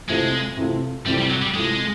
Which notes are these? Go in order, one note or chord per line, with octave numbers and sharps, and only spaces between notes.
C3 E3 G#3 A3 C4 F4
C3 E3 A3 C4 F4
C3 E3 G3 A3 C4 F4
G3
F#3
G3
C3 E3 G#3 A3 C4 F4